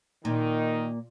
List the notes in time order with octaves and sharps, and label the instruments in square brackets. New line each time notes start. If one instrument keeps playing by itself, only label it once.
[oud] A#2 [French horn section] D#3 D#4